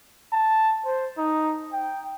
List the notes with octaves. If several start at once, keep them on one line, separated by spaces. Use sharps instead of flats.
A5
C5
D#4
G5